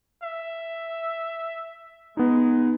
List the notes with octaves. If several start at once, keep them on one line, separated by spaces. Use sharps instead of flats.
E5
G#3 B3 D#4